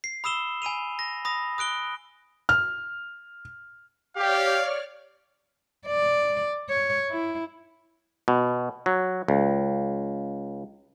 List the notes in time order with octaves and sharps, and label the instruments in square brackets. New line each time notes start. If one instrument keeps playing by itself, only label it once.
[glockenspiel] C7
B5 D#6 E6 E7 G7
G#5 B5 D#7 F7
A#6
B5 D#6 A#6
D#6 F#6 D7 G7
[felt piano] F6
[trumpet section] G4 [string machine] C#5 D5 F6 [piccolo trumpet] F5
[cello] D5
C#5
E4
[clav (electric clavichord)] B2
F#3
C#2